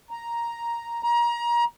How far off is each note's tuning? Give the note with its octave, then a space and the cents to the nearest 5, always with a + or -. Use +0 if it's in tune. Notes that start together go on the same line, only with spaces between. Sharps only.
A#5 +5
A#5 +30